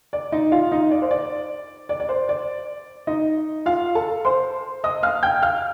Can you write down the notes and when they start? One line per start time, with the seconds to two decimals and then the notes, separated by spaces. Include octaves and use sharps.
0.13 D5
0.32 D#4 D#5
0.52 F4 F5
0.72 D#4 D#5
0.91 D5
1.02 C5
1.11 D5
1.89 D5
2.00 D5
2.09 C5
2.29 D5
3.07 D#4 D#5
3.66 F4 F5
3.95 A4 A5
4.25 C5 C6
4.84 D#5 D#6
5.03 F5 F6
5.23 G5 G6
5.42 F5 F6